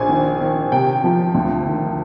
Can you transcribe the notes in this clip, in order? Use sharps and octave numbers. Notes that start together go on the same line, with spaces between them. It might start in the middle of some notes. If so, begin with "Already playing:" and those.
Already playing: A#1 G#5
D#3
D#3
C3 G5
F3
D2
D#3